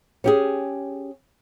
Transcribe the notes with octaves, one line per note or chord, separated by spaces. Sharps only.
C#4 G4 G#4